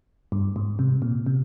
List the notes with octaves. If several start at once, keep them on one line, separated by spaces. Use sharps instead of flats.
G2
G#2
C3
A#2
C3